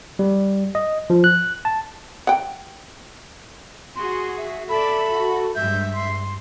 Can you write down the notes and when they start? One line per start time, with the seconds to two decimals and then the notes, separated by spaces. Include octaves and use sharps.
0.19 G3
0.75 D#5
1.10 F3
1.24 F#6
1.65 A5
2.27 F#5 G5
3.96 F#4 G#4 C6
4.37 E5
4.69 A4 D5 E5 B5
5.09 F#4
5.55 G2 G#3 E5 G6
5.94 C6